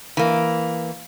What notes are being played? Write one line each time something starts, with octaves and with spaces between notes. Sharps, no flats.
E3 A#3